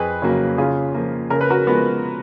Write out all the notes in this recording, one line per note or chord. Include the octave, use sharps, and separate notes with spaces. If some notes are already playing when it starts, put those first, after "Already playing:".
Already playing: F2 G#4 B4
C#3 F#3 A#3
C#3 F4 G#4
F3 A#3
C#3 A#4
B4
F#4 A#4
F3 G#3 B3